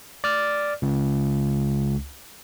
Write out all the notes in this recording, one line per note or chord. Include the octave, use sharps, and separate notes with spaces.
D5 F6
C#2